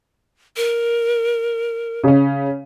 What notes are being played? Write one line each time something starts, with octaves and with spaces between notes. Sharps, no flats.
A#4
C#3 C#4